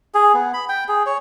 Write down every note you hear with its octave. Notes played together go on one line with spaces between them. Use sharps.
G#4
B3
B5
G5
G#4
C#5